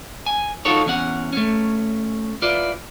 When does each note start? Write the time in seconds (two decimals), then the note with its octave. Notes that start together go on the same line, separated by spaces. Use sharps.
0.26 G#5
0.65 D#4 F4 F#4 A4 C#5
0.86 E2 C#4 F#5
1.33 A3 C#4
2.42 E4 F4 B4 D5